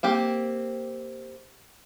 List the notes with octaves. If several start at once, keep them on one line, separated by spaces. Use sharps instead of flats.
A#3 C4 G4